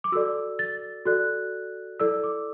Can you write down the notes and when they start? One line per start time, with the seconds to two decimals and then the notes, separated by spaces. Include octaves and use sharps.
0.04 D6
0.12 F#4 A4 D5 E6
0.59 A6
1.06 F#4 A4 D5 F#6
2.00 E4 A4 D5 E6
2.24 D6